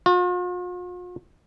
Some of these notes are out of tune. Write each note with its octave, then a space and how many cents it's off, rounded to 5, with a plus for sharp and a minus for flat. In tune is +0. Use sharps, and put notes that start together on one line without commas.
F4 +45